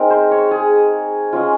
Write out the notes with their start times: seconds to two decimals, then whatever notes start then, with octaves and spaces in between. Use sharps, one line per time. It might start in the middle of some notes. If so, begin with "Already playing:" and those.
Already playing: G#3 C4 D#4 A#4
0.10 C5
0.31 C#5
0.51 G#4
1.33 G#3 C#4 F4